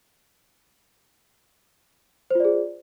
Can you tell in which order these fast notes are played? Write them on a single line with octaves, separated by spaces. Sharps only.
C5 F4 D5 G#4